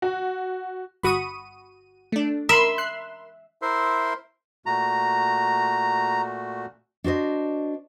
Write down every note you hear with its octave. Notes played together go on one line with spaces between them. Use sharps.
F#4
G1 F#4 B5 C#6 D#6 D#7
A3 D4
A#4 E5 B5 C6
F#6 C7
E4 A#4 C5 E5 C6
A#2 A3 F#4 A#5
D4 F#4 C5 D#5